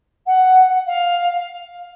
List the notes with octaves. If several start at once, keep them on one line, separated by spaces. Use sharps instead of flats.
F#5
F5